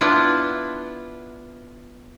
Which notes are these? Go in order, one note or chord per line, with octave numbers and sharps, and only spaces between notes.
B3 D4 E4 F4